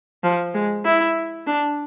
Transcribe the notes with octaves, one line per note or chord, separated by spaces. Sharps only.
F3
G#3
E4
D4